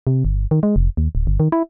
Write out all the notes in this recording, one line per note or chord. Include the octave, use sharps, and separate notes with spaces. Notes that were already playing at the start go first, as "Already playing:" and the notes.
C3
G1
D#3
G#3
F1
D#2
D1
G1
D#3
E4